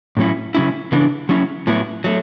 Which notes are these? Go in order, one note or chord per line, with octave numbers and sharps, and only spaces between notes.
A2 F#3 C#4 E4
C#3 F#3 C#4 E4
C#3 E3 B3 D4
F#3 C#4 E4
A2 F#3 B3 E4
F#3 A3